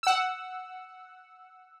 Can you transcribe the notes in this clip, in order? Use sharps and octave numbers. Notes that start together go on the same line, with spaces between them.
F#5 E6